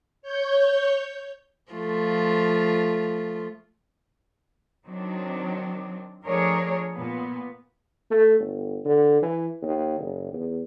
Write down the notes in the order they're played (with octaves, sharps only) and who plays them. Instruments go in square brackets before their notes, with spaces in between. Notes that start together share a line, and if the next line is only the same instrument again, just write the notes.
[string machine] C#5 G6
[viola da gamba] F3 A3 F4
[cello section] D#3 F#3 C4 D4
F3 A3 D4 G#4 A#4 C#5
A#2 B3
[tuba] A3
G1
D3
E3
D#2
F#1
E2